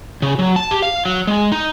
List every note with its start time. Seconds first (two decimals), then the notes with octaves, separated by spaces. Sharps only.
0.22 C#3
0.39 F#3
0.56 A5
0.71 G4
0.82 F5
1.06 F#3
1.27 G#3
1.52 D#4